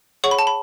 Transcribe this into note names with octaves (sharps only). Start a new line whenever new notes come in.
G#4 C#5 F#5 C#6
B5
A5
B5